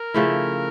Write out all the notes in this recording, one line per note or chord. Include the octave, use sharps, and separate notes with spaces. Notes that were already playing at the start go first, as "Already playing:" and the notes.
Already playing: A#4
C#3 F3 A3 E4